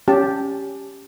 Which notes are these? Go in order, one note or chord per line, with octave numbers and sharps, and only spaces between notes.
C#4 G4 A5